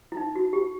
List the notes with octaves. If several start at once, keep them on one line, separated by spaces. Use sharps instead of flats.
E4
D#4
F#4
G4